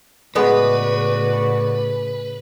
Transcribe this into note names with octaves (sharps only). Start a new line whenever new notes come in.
A2 C#3 G#3 B3 F#4 G#4 B4 D5